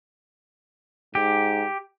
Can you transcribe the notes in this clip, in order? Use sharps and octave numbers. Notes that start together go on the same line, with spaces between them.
G#2 G4